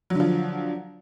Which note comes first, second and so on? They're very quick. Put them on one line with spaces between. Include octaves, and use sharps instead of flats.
F#3 D3 F3